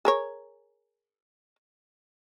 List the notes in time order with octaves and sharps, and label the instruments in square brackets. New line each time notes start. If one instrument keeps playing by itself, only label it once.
[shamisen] G#4 A#4 C#5